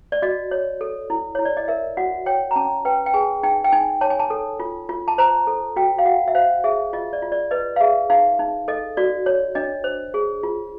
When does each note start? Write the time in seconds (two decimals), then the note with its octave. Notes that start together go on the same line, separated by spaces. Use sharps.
0.12 D5
0.22 F#4 D#5
0.51 C#5
0.81 A4
1.10 E4
1.35 E4 C#5
1.45 D5
1.57 D#5
1.68 A#4 E5
1.97 F#4 F#5
2.26 C#5 G5
2.51 A#5
2.56 C#4 A5
2.85 B4 G5
3.06 G5
3.14 G#4 G#5
3.43 D#4 G5
3.64 G5
3.72 D#4 G#5
4.01 C#5 A5
4.10 G#5
4.20 A5
4.30 A4
4.60 F4
4.89 F4
5.08 A5
5.18 C5 A#5
5.47 A4
5.76 F#4 G5
5.99 F5
6.06 F#4 F#5
6.28 E5
6.35 C5 F5
6.64 G#4 E5
6.93 F4 D#5
7.13 D5
7.22 F4
7.32 D5
7.51 B4 D#5
7.76 F5
7.80 G#4 E5
8.10 D#4 F5
8.39 D#4
8.68 A4 D#5
8.97 F#4 D5
9.26 C#5
9.55 D4 D#5
9.84 C5
10.14 G#4
10.43 F4